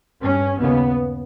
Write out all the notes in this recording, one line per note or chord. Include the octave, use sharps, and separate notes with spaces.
G2 C#4
D#2 C#3 B3